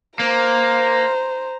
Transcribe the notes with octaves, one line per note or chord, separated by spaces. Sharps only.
A#3 C5 A#5